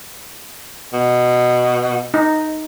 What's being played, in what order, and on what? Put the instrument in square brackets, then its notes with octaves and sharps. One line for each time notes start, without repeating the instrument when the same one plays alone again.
[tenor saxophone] B2
[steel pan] D#4